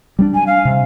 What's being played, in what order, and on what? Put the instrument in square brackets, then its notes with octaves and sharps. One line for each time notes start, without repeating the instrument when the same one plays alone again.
[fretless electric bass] G3 A3 D4
[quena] G#5
F5
[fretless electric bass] C3